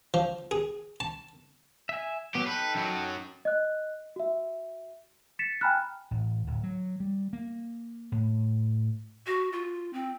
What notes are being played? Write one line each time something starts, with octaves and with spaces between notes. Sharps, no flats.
F3
G#4
A5
E5 G#5
F#3 B3 G4
D#4 A4 B4 G5
F#2 F#3
D#5 F#6
F#4 E5
A6 B6 C#7 E7
G5 G#5 A#5 B5 F6 F#6
A1
D1
F#3
G3
A#3
A2
F#4
F4
C4